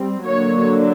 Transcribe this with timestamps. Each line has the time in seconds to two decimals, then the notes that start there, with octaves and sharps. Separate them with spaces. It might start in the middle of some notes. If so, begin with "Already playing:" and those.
Already playing: G3 C4
0.26 D3 F#3 A#3 D4 C#5